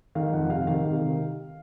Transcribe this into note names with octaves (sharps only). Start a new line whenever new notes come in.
D#3 F5
F2 F#5
C3 F5
D#3 F5
C3
D#3